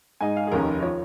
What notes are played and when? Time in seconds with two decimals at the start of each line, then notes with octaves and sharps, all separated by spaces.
0.21 G#2 G#3 D#4 G#5
0.37 F5
0.47 G#4
0.51 F1 D#2 D#3 C#4 A#4
0.83 F3 C#5